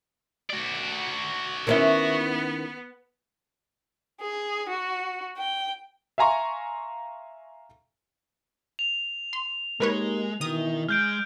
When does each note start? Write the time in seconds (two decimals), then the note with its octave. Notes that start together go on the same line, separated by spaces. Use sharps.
0.50 F#4 D5
1.67 D#3 B3 C#4 E4
4.21 G#4
4.69 F#4
5.37 G5
6.18 E5 F5 G#5 A#5 C6 C#6
8.79 F7
9.33 C6
9.80 G#3 A#3 D#4 G4 A#4 B4 C#5
10.41 B2 D#3 E3 E4 D#6
10.89 G#3 F6 G6 D7